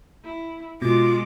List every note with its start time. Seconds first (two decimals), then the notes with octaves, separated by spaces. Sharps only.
0.24 E4
0.82 B2 G#3 F4 D6